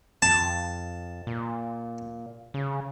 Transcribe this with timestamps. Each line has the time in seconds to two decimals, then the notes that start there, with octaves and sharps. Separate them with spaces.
0.22 F2 A5
1.27 A#2
2.54 C#3